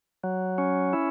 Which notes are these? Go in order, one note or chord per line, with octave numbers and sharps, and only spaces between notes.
F#3
C#4
E4